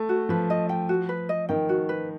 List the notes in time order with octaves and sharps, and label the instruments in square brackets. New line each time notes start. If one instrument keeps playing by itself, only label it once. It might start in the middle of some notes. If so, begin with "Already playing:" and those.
Already playing: [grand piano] A3
[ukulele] F#4
[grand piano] F3 [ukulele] B4
[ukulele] D#5
G5
F#4
B4
D#5
[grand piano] D#3 [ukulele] G5
[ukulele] F#4
B4